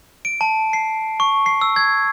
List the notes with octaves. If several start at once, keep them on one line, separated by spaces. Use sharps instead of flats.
D7
A5
C7
C#6
C7
E6
G#6